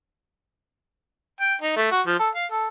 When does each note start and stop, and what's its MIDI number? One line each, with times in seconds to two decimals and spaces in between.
1.40 1.55 79
1.61 1.75 63
1.76 1.89 57
1.91 2.01 66
2.06 2.18 53
2.19 2.29 69
2.35 2.46 77
2.51 2.68 69